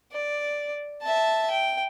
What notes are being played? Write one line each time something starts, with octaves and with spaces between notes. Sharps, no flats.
D5
E5 A5
G5